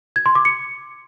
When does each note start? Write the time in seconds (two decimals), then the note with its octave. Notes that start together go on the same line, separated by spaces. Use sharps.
0.16 G#6
0.26 C6
0.35 D6
0.45 C#7